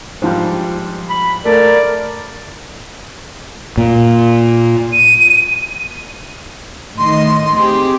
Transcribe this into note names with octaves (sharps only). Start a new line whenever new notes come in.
G#2 F3 G3
B5
A3 A#4 D5
A#2
D#7
A2 D#3 D#5 C6
C4 G4 G#4